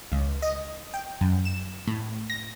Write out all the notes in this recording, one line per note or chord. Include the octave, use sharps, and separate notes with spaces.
C#2
D#5
G5
F#2
E7
A2
A#6